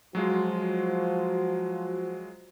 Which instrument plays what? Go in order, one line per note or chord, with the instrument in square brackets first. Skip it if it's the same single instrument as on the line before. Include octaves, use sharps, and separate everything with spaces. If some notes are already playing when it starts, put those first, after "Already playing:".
[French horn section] F3 F#4 [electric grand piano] F#3 G#3 F4